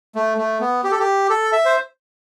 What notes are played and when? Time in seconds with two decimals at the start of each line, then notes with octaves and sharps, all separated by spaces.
0.15 A3
0.38 A3
0.61 B3
0.84 G4
0.92 A4
0.99 G4
1.30 A4
1.53 E5
1.65 C5